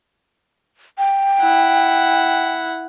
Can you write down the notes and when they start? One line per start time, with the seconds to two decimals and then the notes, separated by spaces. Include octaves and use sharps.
0.98 G5
1.41 E4 F#5